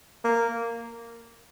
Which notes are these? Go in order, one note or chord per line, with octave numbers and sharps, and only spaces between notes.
A#3